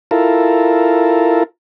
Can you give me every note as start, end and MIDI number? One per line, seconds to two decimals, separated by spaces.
0.11 1.43 64
0.11 1.43 65
0.11 1.43 69
0.11 1.43 70